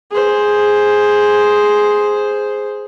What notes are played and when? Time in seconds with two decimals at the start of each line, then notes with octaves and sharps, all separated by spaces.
0.11 G#4 C5